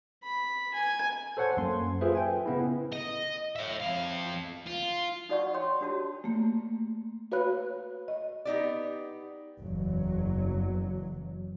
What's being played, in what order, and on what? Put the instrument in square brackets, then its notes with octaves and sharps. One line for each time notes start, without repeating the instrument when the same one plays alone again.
[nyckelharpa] B5
G#5
[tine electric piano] A4 C5 C#5 F#5 G#5 A5
F#2 A#3 C6
F4 G#4 A4 B4 C5 E5
G5 G#5
C#3 B3 E4
[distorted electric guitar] D#5
C#5 E5
F2 F5
F4
[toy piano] D#4 F#4 D5 F#5 C#6
C#5 G5 C6
D4 F#4 G4 A5
[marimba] A3 A#3
F#4 B4 C#5 F5 B5 F#6
D#5
[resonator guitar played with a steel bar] B3 D#4 G4 D5
[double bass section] F#1 E2 F#3